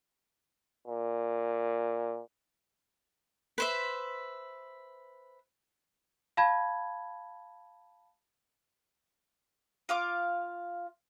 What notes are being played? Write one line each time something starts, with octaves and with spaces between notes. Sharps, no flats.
A#2
B4 C5 E5
F5 A5 B5 G#6
F4 F5 D6